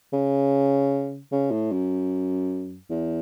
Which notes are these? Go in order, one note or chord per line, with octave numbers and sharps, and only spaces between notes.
C#3
C#3
A2
F#2
E2